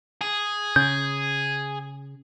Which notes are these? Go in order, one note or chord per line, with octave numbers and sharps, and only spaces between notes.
G#4
C#3 G6